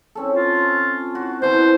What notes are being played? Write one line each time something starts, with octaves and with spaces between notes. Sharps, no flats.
C4 C#4 A4
F4
F#4
B2 E3 C5